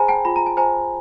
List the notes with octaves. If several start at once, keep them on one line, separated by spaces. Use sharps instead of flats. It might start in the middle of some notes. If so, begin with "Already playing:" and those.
Already playing: G#4 C5 G#5 A#5 B5
G5 A5
F4 B5
A#5
A5
C5 G#5 A#5